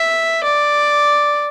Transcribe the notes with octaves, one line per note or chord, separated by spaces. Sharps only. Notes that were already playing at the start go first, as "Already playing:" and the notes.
Already playing: E5
D5